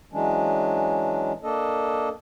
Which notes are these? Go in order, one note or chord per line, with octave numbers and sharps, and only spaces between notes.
E3 F#3 G#3 C#4 D4
A#3 D4 A4 D#5